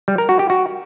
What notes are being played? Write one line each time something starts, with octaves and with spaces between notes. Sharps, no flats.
G3
A#4
F#4
G4
F#4